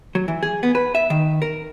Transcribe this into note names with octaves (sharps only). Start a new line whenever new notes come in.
F#3
E3
G#4
B3
B4
E5
D#3
A#4